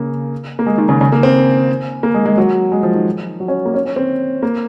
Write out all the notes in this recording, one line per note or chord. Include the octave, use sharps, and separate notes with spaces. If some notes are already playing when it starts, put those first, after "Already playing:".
Already playing: C#3 A#3
A#3
G#3
D#3
C#3
C#3
A#3
C4
A#3
G#3
G#3
F#3
G#3
F3
D#3
F#3
C#4
A#3
C#4
C#4
C4
A#3